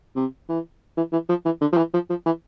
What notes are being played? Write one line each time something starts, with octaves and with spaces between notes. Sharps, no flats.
C3
E3
E3
E3
F3
E3
D3
F3
E3
F3
F3
E3